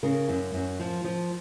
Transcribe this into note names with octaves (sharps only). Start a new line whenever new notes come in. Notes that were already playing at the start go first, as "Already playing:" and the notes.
C#3 A#4
F#2
F#2
F3
F3